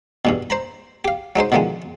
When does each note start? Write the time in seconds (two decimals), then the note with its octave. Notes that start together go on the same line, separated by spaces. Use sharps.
0.25 E2 G2 B2
0.50 C5 A#5 B5
1.05 G4 F5
1.36 F#3 G#3 D#4 C5
1.52 B2 D3 D#3 F3 G#3